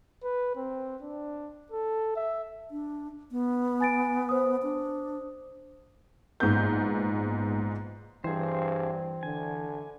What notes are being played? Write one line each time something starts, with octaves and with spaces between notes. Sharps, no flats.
B4
C4
D4
A4
E5
D4
B3
G#5 A6 D7
C5 D#6
D4
A#1 G#2 B3 G6
G2 E3 C4 G#4 C5
D3 G#5